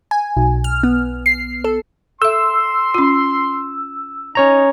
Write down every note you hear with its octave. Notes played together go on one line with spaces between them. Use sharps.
G#5
B1
F6
B3
C7
A4
A4 E5 C6 E6
C#4 F4
C#4 D#4 C#5 A#5